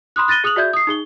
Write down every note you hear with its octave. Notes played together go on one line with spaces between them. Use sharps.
B5 C6 D#6 F#6
F#6 A6 A#6 D#7 G7
G#4 D#6 F#6 F7 F#7
F#4 G#4 D5 E5 G6 G#6
D#6 C7
D#4 G#4 G7